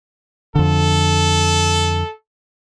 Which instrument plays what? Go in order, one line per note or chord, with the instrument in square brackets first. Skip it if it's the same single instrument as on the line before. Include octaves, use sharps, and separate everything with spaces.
[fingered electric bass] F2 D3 [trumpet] A4